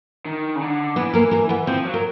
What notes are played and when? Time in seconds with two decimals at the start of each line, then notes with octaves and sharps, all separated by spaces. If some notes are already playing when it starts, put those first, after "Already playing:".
0.25 D#3
0.55 C#3
0.61 D3
0.96 E3 B3 B4
1.14 A#3 A#4
1.31 A#3 A#4
1.49 B3 B4
1.67 F3 C4 C5
1.85 F#3
1.94 A#4